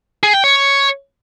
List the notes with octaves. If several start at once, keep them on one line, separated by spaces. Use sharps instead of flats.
G#4
G5
C#5